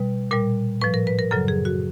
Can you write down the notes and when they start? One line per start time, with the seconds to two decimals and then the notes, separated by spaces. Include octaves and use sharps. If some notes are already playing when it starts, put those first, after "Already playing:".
Already playing: B2 G3 B4
0.31 A#2 G3 A#4
0.81 A2 F3 B4
0.94 A#4
1.07 B4
1.19 A#4
1.31 F#2 C#3 F#3 A4
1.48 G#4
1.65 F#4